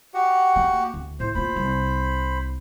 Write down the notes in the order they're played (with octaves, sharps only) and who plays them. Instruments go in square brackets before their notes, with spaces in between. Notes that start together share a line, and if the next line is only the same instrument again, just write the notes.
[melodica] F#4 G4 F#5
[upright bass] A#3
D2
[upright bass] A2 [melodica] C5
[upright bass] A#3 F4 [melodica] C5 B5
[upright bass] C2